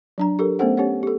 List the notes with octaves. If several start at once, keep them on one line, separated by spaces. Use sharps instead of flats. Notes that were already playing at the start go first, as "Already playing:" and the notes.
F#3 D4 A#5
G4 A4 A#4
A3 B3 C#4 A4 C5 F#5
C#4 G4 C#5 F#5
G4 A4